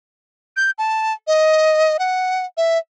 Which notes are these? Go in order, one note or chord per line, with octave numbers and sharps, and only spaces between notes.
G6
A5
D#5
F#5
E5